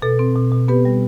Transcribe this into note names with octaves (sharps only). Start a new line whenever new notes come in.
B2 A4
C4
B2
B2
B3 G4 B4
G3